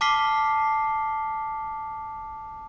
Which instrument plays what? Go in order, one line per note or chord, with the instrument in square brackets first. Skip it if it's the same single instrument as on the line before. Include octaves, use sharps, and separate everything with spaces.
[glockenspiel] A5 D6 F6 B6 C7 G7